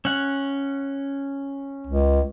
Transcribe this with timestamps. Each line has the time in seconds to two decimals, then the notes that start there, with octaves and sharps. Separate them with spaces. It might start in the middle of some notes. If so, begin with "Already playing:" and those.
0.05 C#4 F#5
1.87 C#2